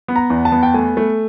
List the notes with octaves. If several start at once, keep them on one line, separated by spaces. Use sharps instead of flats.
B3
A#5
E2
A5
B3
G5
A3 G#5
A3